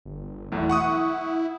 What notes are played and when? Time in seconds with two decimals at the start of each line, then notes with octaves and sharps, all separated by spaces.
0.05 G1
0.52 B1 E2 A3 E4
0.70 F#5 C#6 D#6